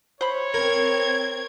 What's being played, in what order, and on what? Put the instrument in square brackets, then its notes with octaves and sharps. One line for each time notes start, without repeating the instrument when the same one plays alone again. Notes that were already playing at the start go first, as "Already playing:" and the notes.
[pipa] C5 B5 [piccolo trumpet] C#5
[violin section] C4 G#6 [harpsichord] A#4